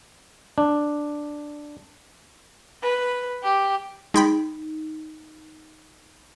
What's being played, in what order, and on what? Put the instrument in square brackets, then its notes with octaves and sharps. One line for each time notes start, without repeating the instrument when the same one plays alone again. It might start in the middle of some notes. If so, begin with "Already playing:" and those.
[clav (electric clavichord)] D4
[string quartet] B4
G4
[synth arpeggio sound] G#3 G5 B5 [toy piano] D#4